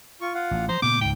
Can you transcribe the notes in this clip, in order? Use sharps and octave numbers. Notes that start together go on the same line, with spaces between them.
F4 C#6
F4 F5 F#5
A1
F3 C5 A#5
A#2 C#3 B3 D6 G6
C#2 G#2 G5